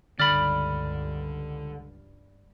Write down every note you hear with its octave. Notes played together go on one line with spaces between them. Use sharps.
C#2 G2 D3 D5 B5 F6